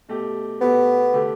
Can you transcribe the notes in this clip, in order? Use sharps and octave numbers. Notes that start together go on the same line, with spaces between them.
B2 A3 G4
B2 A3 B3 G4
D3 A3 G4